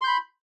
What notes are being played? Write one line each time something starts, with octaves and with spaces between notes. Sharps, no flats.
B5 C6 G6